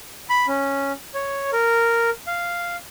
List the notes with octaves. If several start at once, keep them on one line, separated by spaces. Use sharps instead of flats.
B5
C#4
C#5
A#4
F5